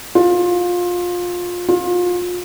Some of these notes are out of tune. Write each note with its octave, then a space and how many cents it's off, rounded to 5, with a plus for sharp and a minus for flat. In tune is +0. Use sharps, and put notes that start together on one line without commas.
F4 +20
F4 +30